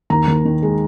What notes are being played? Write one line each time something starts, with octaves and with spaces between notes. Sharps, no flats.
D#2 A#5
D#2
D#3
G#3